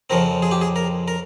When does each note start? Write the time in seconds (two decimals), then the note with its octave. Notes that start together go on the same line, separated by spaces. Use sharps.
0.10 F2 C#3 F3 C4 A#4
0.42 G#4
0.51 G4
0.61 G#4
0.76 A#4
1.08 A#4